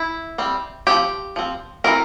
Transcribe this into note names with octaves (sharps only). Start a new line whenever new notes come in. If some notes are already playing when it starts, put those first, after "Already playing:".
Already playing: E4
G3 C4
F3 C4 G4
F3 C4
E3 A3 C4 A#4